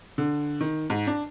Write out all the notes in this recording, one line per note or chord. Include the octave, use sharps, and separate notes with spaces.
D3
D#3
G#2
D4